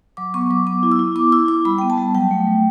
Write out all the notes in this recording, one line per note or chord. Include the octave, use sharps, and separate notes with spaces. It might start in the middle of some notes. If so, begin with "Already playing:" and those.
F#3 D6
B3 C#6
F#3 D6
B3 D6
E4
E6
E4
B3 D6
E4 E6
E4 D6
G3 B5
B3 G5
A5
G3
F#3 G5
A3
F#3